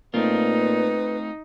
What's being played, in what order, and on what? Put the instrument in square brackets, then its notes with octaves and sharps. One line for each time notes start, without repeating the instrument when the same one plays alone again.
[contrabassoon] A#2 [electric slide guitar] A3 C4 F4 [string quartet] D#4 [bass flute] B4